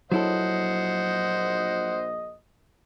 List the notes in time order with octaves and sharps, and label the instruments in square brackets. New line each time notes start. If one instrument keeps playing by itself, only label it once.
[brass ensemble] A#1 D#5 [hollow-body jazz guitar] F#3 E4 A4 [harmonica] C5 F#5